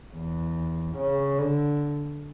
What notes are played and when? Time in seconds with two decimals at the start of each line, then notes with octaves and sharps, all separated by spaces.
0.16 E2
0.97 C#3
1.38 D3